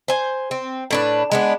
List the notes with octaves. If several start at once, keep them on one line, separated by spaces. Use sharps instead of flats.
C5 G#5
C4
A2 D4 B4
G#3 B3 D4